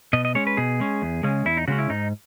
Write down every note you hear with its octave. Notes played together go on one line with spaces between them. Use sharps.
B2 D#5
D#5
G#3 C#4 C#5
B4
B2 G#4
G#3 C#4
E2
C#3 G#3 C#4
E2 E4
D#4
C#3 G#3 C#4 F#4
E4
G#2 D#4